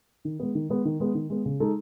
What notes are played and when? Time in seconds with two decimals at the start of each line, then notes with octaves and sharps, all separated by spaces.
0.25 D#3
0.40 G#3 B3
0.55 D#3
0.70 G#3 B3
0.85 D#3
1.00 G#3 B3
1.15 D#3
1.30 G#3 B3
1.45 C#3
1.60 G#3 D#4 A4